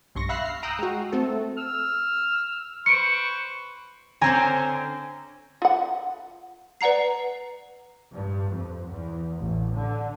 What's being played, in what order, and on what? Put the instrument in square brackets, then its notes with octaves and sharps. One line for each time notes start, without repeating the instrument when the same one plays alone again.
[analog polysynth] B1 G2 C6 C#6 A#6
E5 F5 B5 F#6 A#6 C7
F6 C7
G5 A#5 D#6 E6 F#6
G#3 F#4
A3 C4 A4
[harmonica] E6 F6
[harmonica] B4 C5 C#6 [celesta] C#7 D7
[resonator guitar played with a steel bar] D3 C4 C#4 [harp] G#5 A#5
[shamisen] F4 F#5
[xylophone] B4 D5 F#5 A#5 C7
[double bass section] G2
F2
E2
A1
D3